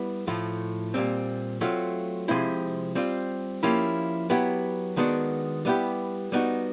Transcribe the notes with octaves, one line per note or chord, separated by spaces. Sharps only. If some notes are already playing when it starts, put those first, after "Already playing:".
Already playing: G3 B3 E4
A2 F3 A3
A#2 G3 C4
F#3 A3 C4 F4
C3 F3 G#3 C4 E4
G3 C4 F4
F3 A#3 C#4 E4 G4
F#3 B3 E4 G4
D#3 G#3 B3 D4 F#4
G3 B3 E4 G4
G3 B3 D#4 F#4